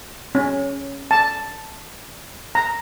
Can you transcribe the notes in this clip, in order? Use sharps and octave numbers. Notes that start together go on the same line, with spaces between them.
C#4
A5
A#5